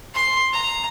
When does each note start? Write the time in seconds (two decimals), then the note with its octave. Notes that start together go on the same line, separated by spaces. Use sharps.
0.14 C6
0.53 A#5